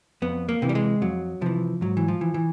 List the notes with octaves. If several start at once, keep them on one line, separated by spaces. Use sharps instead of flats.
F2 B3
A#3
C3 E3
G3
G#3
F2 F#3
C3 E3 F3
G#2 F#3
E3
F3
E3
E3